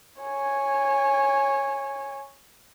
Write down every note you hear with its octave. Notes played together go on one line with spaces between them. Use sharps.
C#5 G#5